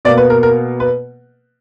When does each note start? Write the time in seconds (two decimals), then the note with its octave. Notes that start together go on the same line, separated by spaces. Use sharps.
0.05 B2 D5
0.08 A#3
0.17 B4
0.30 A#4
0.43 A#4
0.80 B4